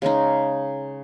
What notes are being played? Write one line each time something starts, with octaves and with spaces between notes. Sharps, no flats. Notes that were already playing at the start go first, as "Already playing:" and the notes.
C#3 G#3 C#4 D#4